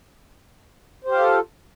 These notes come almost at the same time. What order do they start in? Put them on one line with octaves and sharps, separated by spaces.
C5 G4 F5 F4 A4